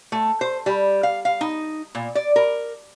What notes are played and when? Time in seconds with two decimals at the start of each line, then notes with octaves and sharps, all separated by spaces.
0.12 A3
0.41 C5
0.66 G3
1.03 F5
1.25 F5
1.41 D#4
1.95 A#2
2.15 D5
2.36 A#4